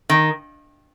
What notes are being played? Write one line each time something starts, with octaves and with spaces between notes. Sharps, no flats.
D#3